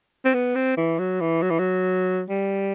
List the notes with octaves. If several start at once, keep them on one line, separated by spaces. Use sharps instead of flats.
C4
B3
C4
E3
F#3
E3
F#3
E3
F#3
G3